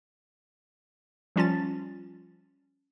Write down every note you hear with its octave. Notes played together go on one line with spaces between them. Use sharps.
F3 G3 C#4 F4 A5 A6